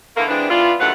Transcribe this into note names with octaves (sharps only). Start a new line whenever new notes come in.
D3 E3 A3 A#3
E3 G#3 B3 C4 D4
E3 B3 D4 F4
D#2 D3 F#3 A3 B4 F#5